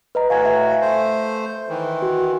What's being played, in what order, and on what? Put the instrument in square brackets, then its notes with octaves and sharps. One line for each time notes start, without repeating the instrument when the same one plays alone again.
[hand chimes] B4 D#5 A#5
[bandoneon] A2 F#4 [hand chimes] F5 G#5 G#6
[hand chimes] E5
[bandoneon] A3 C5
D#3 E3
[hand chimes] F#4